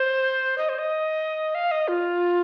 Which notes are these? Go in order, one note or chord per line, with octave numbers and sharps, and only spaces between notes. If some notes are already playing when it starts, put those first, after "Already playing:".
Already playing: C5
D#5
C5
D#5
F5
D#5
F4